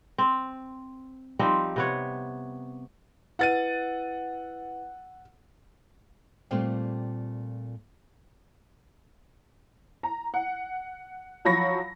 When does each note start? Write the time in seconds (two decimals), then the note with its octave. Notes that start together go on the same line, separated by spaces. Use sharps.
0.18 C4
1.39 F3 G3 C4 D#4
1.76 C3 B3 C#5
3.39 E4 B4 D#5 F#5 A6 D#7
6.51 A#2 G3 A3 C4 F4 G5
10.03 A#5
10.34 F#5
11.45 F3 F#3 B5 C#6 A#6